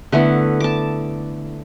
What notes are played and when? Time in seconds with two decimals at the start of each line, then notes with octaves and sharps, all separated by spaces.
0.12 D3 A3 B3 E4
0.60 A5 D6